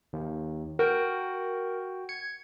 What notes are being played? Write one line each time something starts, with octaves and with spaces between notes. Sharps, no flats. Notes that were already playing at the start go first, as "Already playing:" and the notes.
D#2
F#4 A#4 G5
G#6 C#7